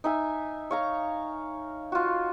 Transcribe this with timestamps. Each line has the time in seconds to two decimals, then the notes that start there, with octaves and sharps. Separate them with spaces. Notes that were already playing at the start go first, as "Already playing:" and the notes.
0.04 D#4 E5 G#5
0.71 C#5 F5 A#5
1.92 F4 F#4